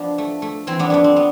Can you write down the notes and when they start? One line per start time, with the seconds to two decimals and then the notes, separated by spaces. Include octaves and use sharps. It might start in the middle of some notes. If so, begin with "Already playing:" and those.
Already playing: F3 B3 D4
0.18 A3
0.42 A3
0.67 E3 C4
0.79 B3 D4
0.90 F2 B3 D4
1.04 C4
1.16 B3